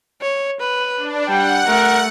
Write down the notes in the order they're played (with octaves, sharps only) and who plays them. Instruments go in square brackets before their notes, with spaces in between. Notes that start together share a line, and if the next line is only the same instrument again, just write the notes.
[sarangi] C#5
B4
[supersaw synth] D4
[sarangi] G3 [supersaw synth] F#5 [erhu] G5
[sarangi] A3 [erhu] A#4